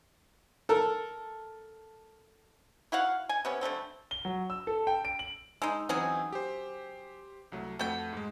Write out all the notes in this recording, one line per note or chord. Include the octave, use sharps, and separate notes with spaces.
A4 A#4
E4 F#4 F5 F#5
G#5
C3 B3 C#4
D3 G3 A3 C4
G7
F#3
E6
A4
G5
D7
F#7
G#3 D#4 E6
E3 F#3 C4 C#4 D#4 G#4
G4 C5
C2 F#3 A3
F2 A3 F#4 G5
G#2 G#3